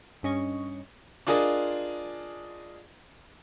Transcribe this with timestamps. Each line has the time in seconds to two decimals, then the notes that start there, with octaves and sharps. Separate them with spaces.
0.23 G2 C#4 D#5 C#6
1.27 D4 F4 G#4 A#4 D5 D#5